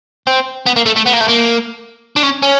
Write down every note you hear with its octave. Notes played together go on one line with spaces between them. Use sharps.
C4
B3
A#3
A3
A3
B3
A#3
A3
A#3
D4
C#4
C#4